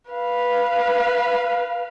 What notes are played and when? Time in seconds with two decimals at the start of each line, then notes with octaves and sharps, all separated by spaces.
0.12 B4 F5